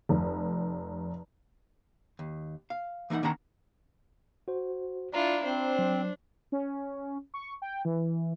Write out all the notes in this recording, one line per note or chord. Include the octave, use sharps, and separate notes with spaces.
F1
D#2
F5
E3 A#3 C#4 D#4 F#5
D#3 A#3 C#4 D4 F#5 A#5
F#4 C5
D4 E4 F4 A#5
C4 D4 C5
F#3
C#4
C#6
G5
E3